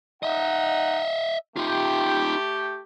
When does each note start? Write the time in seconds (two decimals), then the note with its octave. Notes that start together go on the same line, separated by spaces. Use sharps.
0.23 D#4 D#5 E5 F#5
1.57 A3 D#4 F4 G4